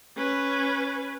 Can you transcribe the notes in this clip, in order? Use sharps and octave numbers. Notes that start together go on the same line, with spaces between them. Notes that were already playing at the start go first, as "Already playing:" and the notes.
C#4 B4